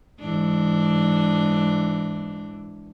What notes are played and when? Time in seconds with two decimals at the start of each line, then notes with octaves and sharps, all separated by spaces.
0.19 G#2 E3 D4